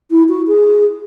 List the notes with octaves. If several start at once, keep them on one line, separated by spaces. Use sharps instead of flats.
E4
F#4
G#4